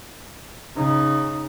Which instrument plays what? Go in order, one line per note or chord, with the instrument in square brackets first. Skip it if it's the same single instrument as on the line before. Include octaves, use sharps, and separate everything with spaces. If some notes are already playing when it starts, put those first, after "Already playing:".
[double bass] C#3 D#4